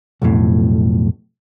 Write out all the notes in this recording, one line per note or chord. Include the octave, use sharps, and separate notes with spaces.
B1 F2 A2